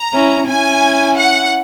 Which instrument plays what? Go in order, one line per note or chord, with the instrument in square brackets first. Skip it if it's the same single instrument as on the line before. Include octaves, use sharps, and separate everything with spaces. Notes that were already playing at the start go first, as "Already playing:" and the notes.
Already playing: [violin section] A#5
[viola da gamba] C#4 E4
[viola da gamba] C#4 E4 [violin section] G#5
[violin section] F#5